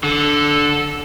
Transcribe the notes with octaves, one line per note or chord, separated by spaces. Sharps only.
D3 A4